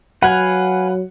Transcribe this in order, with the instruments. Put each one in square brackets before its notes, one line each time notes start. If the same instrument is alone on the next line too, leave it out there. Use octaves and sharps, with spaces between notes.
[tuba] F#3 [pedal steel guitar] B4 F5 G#5 [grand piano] F#5